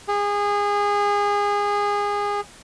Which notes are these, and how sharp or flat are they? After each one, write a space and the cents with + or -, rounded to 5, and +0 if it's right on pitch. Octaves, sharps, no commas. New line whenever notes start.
G#4 -25